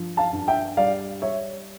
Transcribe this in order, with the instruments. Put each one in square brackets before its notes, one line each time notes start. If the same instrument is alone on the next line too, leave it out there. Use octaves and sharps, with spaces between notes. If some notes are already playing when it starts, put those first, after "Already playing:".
Already playing: [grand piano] G2 F3
F5 A5
G2
E5 G5
G3 D5 F5
G3 C#5 E5